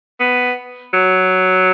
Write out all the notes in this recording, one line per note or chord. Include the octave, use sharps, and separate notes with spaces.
B3
F#3